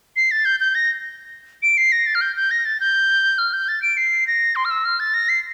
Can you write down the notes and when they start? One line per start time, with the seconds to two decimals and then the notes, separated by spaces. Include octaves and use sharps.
0.16 C7
0.31 A6
0.45 G6
0.60 G6
0.75 A#6
1.63 D7
1.77 C7
1.92 A#6
2.07 A6
2.15 F6
2.21 G6
2.36 G6
2.51 A#6
2.65 A6
2.80 G6
3.38 F6
3.53 G6
3.68 A6
3.82 D7
3.97 C7
4.27 A#6
4.56 C6
4.65 F6
4.71 E6
4.85 F6
5.00 A6
5.14 A#6
5.29 C7